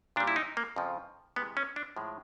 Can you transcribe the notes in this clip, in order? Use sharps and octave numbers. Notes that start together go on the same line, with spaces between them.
A#2 G3 D4
E4
D#4
A#3
F2 C#3 F3
C3 E3 G#3 B3
C#4
D4
A2 F3 G#3